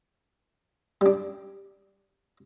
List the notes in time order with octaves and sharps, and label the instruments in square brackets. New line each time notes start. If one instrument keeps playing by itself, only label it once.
[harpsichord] G3 D4